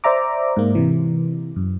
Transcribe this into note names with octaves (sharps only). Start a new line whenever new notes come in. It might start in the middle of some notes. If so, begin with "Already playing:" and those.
C5 D5 E5 A#5 D6
G#2 A#3
C3 E3
F#2